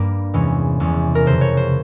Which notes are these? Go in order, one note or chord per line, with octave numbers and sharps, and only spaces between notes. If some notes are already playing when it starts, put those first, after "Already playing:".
Already playing: G2 G3 A#3
E2 C3 E3 G#3 C#4
E2 C3 E3 G#3 C#4
A#4
F2 C#3 E3 C5
C#5
C5